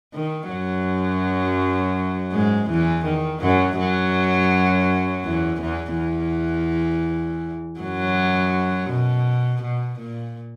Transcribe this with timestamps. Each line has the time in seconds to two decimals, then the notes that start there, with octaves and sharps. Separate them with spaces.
0.14 D#3
0.50 F#2 F#3
2.32 G#2 G#3
2.70 E2 E3
3.05 D#3
3.42 F#2 F#3
3.79 F#2 F#3
5.24 E2 E3
5.61 E2 E3
5.97 E2 E3
7.80 F#2 F#3
8.90 B2
9.62 B2
10.00 A#2